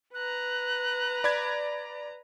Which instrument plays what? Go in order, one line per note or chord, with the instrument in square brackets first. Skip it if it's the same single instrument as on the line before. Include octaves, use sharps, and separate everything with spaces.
[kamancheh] B4 A#5 [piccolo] F#6
[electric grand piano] D5 B5 G#6